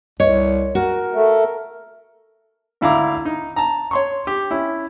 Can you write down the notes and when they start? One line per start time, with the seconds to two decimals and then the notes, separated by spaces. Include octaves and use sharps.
0.20 C2 C#5 D#5
0.75 F#4 A#4
1.15 A3
2.81 G#1 D2 E4 F5 A#5 D6
3.25 D#4
3.56 A5 A#5
3.91 C#5 C6 C#6
4.27 G4
4.51 C#4 E4